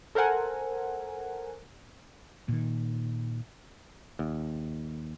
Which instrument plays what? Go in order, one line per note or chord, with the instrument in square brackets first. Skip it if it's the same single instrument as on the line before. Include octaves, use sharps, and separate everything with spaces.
[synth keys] A4 A#4 C5 F#5 G#5
[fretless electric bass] A#2 D#3
[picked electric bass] D#2